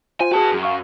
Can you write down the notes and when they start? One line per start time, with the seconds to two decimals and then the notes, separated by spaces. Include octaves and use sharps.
0.20 F4 C5 G#5
0.32 F#4 G#4 B4 A5
0.51 F#2
0.63 F5 C#6